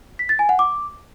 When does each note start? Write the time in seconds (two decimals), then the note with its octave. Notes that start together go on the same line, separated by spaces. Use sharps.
0.19 B6
0.29 A6
0.39 G#5
0.49 F#5
0.59 D6